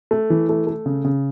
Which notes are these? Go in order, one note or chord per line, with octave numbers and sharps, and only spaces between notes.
A3
E3
A3
A3
C#3
C#3